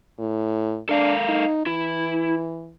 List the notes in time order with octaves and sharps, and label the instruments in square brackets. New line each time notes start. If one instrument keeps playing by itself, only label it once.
[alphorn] A2
[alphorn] D4 [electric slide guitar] A4 A#4 F5
[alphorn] D#4
[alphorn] E3 [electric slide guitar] E4